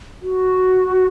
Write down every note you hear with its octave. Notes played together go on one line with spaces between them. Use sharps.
F#4